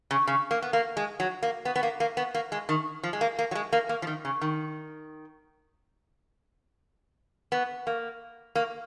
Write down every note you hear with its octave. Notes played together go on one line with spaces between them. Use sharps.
C#3
C#3
A#3
B3
A#3
G#3
F#3
A#3
B3
B3
A#3
A#3
B3
A#3
G#3
D#3
F3
G#3
A#3
A#3
F#3
G#3
A#3
A#3
F3
D#3
C#3
D#3
B3
A#3
A#3